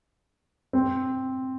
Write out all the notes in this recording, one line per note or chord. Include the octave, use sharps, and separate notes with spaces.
C4